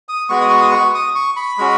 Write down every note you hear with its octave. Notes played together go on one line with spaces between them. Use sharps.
D#6
G#3 B3 F#4 C#6
D#6
C#6
D#6
C#6
D#6
C#6
B5
G#3 C#4 F#4